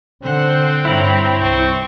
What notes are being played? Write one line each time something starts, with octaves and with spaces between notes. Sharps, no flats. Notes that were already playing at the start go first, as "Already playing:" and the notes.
D3 C4 C5 F#5
G2 E4 C#5 A#5 B5
C2 C4 C#6